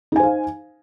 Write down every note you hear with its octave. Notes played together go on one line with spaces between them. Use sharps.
D#4 C5 F5 G#5